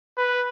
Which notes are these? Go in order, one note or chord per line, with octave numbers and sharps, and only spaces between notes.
B4